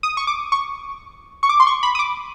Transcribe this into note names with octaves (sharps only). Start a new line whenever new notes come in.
D#6
C#6
D6
C#6
C#6
D6
C6
C#6
B5
D#6
D6